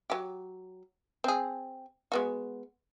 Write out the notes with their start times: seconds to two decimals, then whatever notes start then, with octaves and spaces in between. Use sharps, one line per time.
0.10 F#3 G4
1.24 C4 G#4
2.12 G#3 B3 F#4